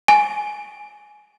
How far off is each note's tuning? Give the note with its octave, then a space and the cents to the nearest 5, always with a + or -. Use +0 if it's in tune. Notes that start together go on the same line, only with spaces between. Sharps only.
G#5 +5